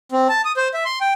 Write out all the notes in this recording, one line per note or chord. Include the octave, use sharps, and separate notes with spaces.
C4
A5
D#6
C5
E5
C6
G5